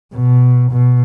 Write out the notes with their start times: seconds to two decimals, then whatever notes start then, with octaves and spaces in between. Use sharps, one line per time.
0.13 B2
0.71 B2